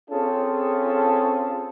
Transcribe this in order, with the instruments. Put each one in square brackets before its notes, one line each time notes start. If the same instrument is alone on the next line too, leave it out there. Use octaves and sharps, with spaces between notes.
[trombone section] C4 C#4 F4 G#4 A4